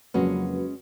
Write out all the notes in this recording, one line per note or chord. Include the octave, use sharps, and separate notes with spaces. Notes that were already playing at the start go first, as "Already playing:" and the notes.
F2 C#3 F#3 G#3 A#3 C#4 F#4 B4